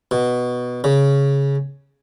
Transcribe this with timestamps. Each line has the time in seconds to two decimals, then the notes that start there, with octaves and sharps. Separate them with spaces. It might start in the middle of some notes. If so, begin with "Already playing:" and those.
0.11 B2
0.84 C#3